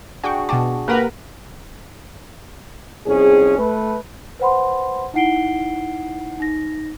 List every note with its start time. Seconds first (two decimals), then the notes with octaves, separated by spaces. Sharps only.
0.24 D4 F#4 G#4 G5 C#6
0.49 B2 F#5 G5 A5 D6
0.88 A#3 G4 A#4 B4 F#5
3.07 C2 F2 C#4 G#4
3.58 A3 B4
4.40 B4 C5 F#5 B5 C6
5.14 D#4 E4 F#5 C7 D7 G7
6.40 D#4 A#6